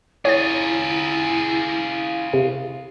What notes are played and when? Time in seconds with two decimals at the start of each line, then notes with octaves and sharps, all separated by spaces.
0.25 E4 F4 G#4 C#5 A6
2.34 C3